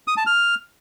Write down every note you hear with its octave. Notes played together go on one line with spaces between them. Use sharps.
D#6
A5
F6